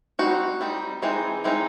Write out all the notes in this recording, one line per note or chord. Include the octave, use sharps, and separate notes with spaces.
G3 C4 D#4 F#4
G3 C4 D#4
E3 G#3 C4 D#4
E3 G#3 C4 D#4